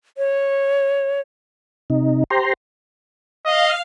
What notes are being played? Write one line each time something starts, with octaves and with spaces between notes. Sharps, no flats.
C#5
C3 D#4
G4 C5 A#5 C6
D#5 F5